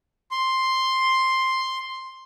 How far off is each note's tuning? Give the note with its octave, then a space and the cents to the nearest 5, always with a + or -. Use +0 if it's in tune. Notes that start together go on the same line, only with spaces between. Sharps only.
C6 +5